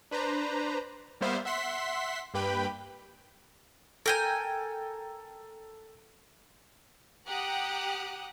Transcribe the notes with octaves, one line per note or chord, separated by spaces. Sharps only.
D4 B4 C5 A#5
G3 A#3 B3 C5 E5 F5
E5 F#5 C6 B6
G2 A#3 G4 B4 G5 B5
A4 A#4 G5 G#5
G4 F#5 A#5 D#6 F#6